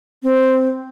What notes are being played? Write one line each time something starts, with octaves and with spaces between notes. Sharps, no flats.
C4